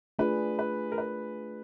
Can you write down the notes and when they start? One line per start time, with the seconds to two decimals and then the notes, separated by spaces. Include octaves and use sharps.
0.19 A3 D4 F4 G#4 B4
0.59 B4
0.92 A#4
0.98 B4